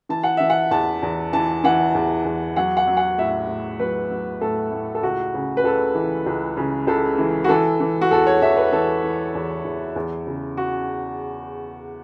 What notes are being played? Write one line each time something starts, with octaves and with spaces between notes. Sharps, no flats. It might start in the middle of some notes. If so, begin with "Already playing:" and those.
E3 A5
F#5
E3 E5
F#5
E2 A5
E2
E3 A5
E3 F#5
E2
E2
F#3 F#5
F#5
F#3
F#5
A2 E5
A2
F#3 B4
F#3
A2 A4
A2
A4
C#2 F#4
C#3
B4
C#2 A4
E3
C#2
C#3
C#2 A4
E3
F#4
E3 A4
E3
F#4
E2 A4
C#5
E2 E5
B4
E3 A4
E3
E2
E2
E2
C#3
F#4